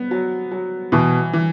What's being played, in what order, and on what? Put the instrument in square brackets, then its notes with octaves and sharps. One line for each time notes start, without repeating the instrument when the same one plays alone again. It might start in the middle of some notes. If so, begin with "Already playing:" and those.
Already playing: [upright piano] B3
F#3
F#3
[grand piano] B2 [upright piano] E3
[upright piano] E3